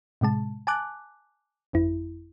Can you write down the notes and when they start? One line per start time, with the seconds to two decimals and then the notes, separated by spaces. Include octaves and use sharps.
0.21 A2 C3 G#3 A5
0.67 G#5 A5 D6 F#6
1.73 G1 F2 E4